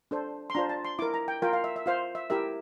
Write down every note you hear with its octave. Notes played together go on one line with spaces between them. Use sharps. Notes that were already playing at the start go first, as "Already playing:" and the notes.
D4 A4 C5
C6
D4 F4 C5 A#5
A5
C6
E4 A#4 D6
A#5
G5
F4 A#4 G5
F5
E5
E5
F4 C5 F5
E5
E4 G4 A#4 E5